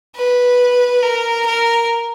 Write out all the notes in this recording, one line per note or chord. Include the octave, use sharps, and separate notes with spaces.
B4
A#4
A#4